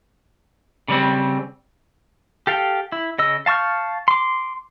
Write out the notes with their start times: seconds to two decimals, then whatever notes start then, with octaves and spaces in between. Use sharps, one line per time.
0.88 C#3 G3 C4
2.47 G4 A4 F5 G5
2.92 E4
3.19 C#3 D#5 E6
3.46 F5 A5 C#6 F6 G6
4.08 C6 D6